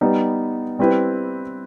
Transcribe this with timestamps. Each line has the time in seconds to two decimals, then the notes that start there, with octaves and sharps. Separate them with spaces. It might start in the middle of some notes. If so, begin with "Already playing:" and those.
0.01 G3 B3 D#4
0.79 G3 C4 E4 G4 B4